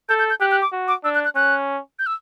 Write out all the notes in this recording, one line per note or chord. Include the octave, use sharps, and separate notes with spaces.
A4 G6
G6
G6
G4 F#6
F#6
D6
F#4
D6
D4 E6
F#6
F#6
C#4 F#6
G6
E6